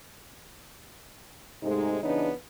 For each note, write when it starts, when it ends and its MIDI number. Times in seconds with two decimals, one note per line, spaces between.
1.63 1.97 44
1.63 1.97 48
1.63 1.97 56
1.63 1.97 57
1.63 1.97 60
1.63 1.97 63
2.03 2.30 49
2.03 2.30 52
2.03 2.30 59
2.03 2.30 62
2.03 2.30 63
2.03 2.30 73